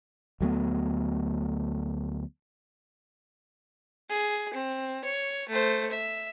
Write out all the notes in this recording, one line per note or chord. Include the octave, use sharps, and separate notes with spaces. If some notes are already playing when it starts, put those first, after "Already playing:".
D2 F#3 A3 B3
G#4
C4
C#5
A3 C5
E5